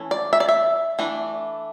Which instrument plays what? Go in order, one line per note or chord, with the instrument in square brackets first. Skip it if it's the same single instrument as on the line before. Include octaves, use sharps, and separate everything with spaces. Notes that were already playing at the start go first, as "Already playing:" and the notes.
Already playing: [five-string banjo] E3 A3 C#4
D5
E5
D5
E5
E3 A3 D4